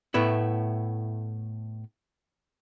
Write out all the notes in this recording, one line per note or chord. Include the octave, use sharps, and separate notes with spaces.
A2 A3 B3 E4